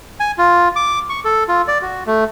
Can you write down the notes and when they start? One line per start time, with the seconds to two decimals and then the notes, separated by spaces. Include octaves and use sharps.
0.20 G#5
0.38 F4
0.76 D6
1.09 C#6
1.24 A4
1.48 F4
1.68 D5
1.82 F#4
2.06 A3